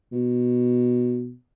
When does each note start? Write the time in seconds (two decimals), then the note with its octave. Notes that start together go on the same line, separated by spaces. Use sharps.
0.12 B2